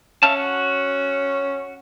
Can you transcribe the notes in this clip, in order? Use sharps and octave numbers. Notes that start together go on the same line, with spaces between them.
C#4 E5 F5 A5
F#4